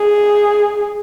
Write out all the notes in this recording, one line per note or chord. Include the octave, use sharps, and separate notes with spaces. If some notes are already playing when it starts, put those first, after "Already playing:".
Already playing: G#4